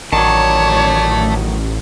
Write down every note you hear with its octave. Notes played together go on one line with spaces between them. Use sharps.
A1 D#3 F#3 A3 C#5 D5 A5